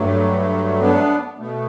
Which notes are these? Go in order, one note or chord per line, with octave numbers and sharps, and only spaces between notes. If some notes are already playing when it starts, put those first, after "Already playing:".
Already playing: G2 F#3 A3
B3 D4
B2 A3